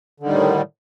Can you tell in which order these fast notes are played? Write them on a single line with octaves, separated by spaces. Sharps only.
D3 D#3 G3 A2